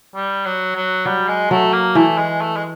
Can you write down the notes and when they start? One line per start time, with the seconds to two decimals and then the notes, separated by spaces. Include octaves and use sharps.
0.15 G3
0.46 F#3
0.76 F#3
1.05 F#3 G3
1.28 G#3
1.51 F#3 A3
1.73 A#3
1.95 E3 A3
2.18 G#3
2.41 A3
2.56 G#3